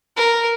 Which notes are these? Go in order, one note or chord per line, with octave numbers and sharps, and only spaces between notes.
A#4